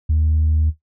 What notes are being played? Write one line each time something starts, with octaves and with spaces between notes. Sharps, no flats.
D#2